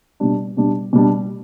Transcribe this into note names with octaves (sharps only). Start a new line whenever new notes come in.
B2 G3 D4
B2 G3 D4
B2 G3 D4